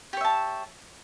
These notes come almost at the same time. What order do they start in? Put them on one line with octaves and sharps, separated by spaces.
G4 C#5 E5 A5